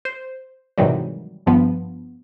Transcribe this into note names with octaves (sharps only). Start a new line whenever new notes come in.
C5
G#2 C3 D#3 E3 F#3 G3
G#1 G2 F3 B3